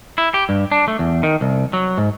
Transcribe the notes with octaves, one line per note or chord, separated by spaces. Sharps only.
E4
G4
G2
D4
A3
E2
D#3
C2
F#3
G#2